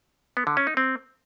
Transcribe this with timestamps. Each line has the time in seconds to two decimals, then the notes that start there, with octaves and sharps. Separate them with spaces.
0.37 B3
0.47 D3
0.57 C#4
0.67 D#4
0.77 C4